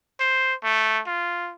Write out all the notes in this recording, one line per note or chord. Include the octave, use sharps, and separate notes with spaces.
C5
A3
F4